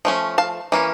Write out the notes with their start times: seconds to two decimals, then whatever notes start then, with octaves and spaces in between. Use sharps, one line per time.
0.05 F3 A3 C#4
0.38 F5 A5
0.72 E3 A#3 C#4